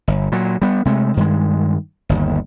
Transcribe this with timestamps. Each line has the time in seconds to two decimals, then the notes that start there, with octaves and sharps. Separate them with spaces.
0.08 G1
0.32 A#2 F#3
0.62 G3 B3
0.85 C3 G#3 A3
1.17 G2 D#3 G#3
2.09 G1 D#2